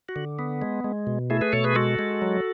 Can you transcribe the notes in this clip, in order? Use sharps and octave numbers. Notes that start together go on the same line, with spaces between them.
F#4
D3
B3
G#3
G#3
B2
A3 E4 G#4
G#4 B4
B2 A4 C#5
G#4 B4
G#3 F#4 A4
G#3
F#3